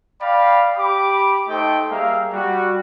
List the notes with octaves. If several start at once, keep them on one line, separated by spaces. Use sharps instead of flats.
D5 F5 G5 B5
G4 B5 D6
A3 D#4 A4 C5 D#5 G5
G3 A#3 G#4 E5 F5 A#5
G3 F#4